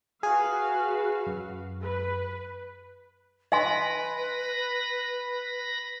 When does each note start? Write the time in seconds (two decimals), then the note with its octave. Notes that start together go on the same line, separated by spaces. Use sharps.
0.23 F#4 G#4 B4 F5
1.27 F#2
1.82 B4
3.52 B4 D#5 G#5 B5 C6 A#6